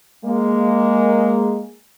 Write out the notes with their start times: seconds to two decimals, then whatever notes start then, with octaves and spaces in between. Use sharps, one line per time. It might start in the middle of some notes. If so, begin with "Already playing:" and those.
0.25 G#3 A#3